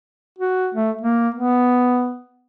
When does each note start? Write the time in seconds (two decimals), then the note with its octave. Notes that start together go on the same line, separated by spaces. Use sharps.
0.39 F#4
0.74 A3
1.01 A#3
1.34 B3